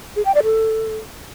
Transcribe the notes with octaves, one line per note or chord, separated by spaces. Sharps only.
G#4
G5
D5
A4